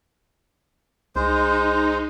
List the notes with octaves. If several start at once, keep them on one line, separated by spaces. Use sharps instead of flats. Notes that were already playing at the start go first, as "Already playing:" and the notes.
C2 G#3 D#4 C5